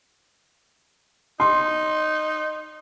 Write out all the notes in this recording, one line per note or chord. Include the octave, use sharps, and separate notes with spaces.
D#4 C6